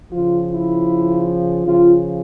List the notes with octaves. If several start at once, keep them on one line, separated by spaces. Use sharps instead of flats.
C#3 F3 F4
E4
C#3 F3 F4